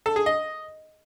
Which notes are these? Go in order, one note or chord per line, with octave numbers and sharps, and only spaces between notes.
A4
G#4
D#5